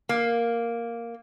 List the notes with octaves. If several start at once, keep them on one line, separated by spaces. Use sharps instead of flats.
A#3